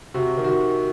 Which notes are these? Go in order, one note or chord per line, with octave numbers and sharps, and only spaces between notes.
C3 F#4
D#3
F#4